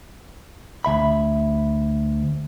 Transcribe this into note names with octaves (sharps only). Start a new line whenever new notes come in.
D2 E5 B5